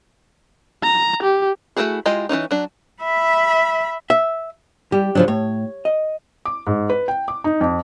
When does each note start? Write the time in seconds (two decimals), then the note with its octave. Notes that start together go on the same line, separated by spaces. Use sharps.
0.83 A#5
1.23 G4
1.76 A3 A#3 E4 F#4 G#4
2.06 G#3 E4 F4 G4 D#5
2.29 E3 F#3 C#4 D#4
2.51 F#3 D4
3.03 E5 B5
4.10 E5
4.92 G3 G4
5.15 C#3 F3 F#3 D4
5.28 A2 C#5
5.85 D#5
6.45 D6
6.67 G#2
6.90 B4
7.08 G5
7.28 D6
7.44 D#4
7.61 F2